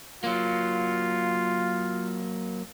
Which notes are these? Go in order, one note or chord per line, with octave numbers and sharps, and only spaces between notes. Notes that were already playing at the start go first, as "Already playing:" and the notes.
F#3 A#3 F4